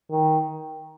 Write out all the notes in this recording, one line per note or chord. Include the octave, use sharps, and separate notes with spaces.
D#3